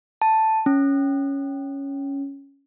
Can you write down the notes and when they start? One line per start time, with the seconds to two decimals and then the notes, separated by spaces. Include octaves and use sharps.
0.22 A5
0.66 C#4